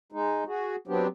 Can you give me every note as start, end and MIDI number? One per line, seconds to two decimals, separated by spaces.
0.12 0.44 56
0.12 0.44 63
0.47 0.76 66
0.47 0.76 68
0.87 1.08 54
0.87 1.08 59
0.87 1.08 60
0.87 1.08 62
0.87 1.08 67